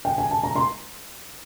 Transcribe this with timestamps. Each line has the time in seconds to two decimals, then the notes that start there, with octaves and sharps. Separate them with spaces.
0.05 G5
0.18 G#5
0.31 A5
0.44 A#5
0.56 C6